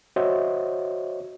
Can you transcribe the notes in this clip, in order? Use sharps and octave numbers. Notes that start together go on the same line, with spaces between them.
F#4 C5 C#5 D#5 E5